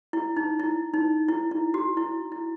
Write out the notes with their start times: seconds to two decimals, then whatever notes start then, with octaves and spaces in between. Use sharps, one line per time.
0.13 E4
0.37 D#4
0.60 E4
0.94 D#4
1.29 E4
1.51 E4
1.74 F#4
1.97 E4
2.32 E4